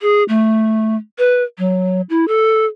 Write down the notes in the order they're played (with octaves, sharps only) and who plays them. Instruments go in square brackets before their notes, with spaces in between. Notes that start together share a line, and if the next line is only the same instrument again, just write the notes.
[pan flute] G#4
A3
B4
F#3
E4
A4